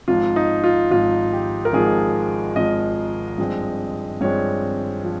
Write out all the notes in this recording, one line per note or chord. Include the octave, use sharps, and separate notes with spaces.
G#1 G#2 F3 F4
D#4
F4
G#1 G#2 F3 F4
G4
A#4
G#1 G#2 F3 G#4
G#1 G#2 F3 D#5
G2 F3 G#3 C4
G2 F3 G#3 C4 C#5
F3